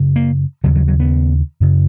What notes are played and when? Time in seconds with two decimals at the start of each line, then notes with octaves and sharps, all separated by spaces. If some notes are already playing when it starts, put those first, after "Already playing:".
Already playing: F#2 C#3
0.16 A#3
0.64 D#2 C#3 F#3
0.76 F#3
0.88 F#3
1.00 B3
1.60 F#2 C#3